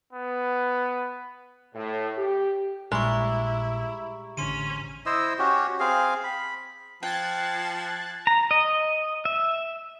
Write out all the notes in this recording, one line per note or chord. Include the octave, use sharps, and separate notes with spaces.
B3
A2
G4
A#1 A#2 G3 G#3 E4 A#5 C#6
A1 D3 C#4 C6 D#7
E4 C5 D#5 E6
C#4 F#4 G4
C4 G#4 F5
B5
F3 G5 F#6 G#6 A6
A#5
D#5
E5